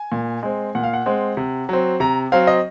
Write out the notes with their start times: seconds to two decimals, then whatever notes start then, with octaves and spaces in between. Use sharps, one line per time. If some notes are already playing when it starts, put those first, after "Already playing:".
Already playing: G#5
0.12 A#2
0.43 G#3 C4
0.75 A#2 F#5
0.83 F5
0.93 F#5
1.06 G#3 C4
1.37 C3
1.69 F#3 C4
2.00 C3 A#5
2.32 F#3 C4 F5
2.47 D#5